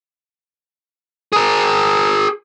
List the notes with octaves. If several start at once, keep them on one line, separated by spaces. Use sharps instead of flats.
G#4 A#4